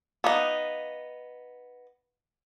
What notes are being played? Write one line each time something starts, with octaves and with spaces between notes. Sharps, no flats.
B3 D#4 F5 A#5 D6